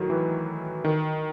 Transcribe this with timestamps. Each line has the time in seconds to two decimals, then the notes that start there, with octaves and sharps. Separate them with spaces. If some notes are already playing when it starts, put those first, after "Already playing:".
Already playing: A2 D#3 F#3
0.10 E3
0.84 D#3